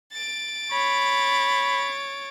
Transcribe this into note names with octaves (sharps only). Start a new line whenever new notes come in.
A6 D7
C#5 B5